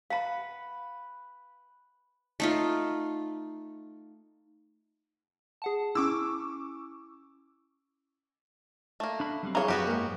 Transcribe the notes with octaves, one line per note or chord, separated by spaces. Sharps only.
B4 F5 F#5 A#5 B5
A3 D#4 F4
G#4 F#5 A5
C#4 E4 C#6 D6 E6
A3 A#3
D4 B5
F#3 G3 C4
E3 G#4 C#5 F5 A#5
F#2 F#3 B3 F#4 G4 G#5
G#2 A#3